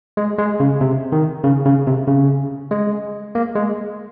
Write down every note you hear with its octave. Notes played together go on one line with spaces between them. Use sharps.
G#3
G#3
C#3
C3
D#3
C#3
C#3
C3
C#3
G#3
A#3
G#3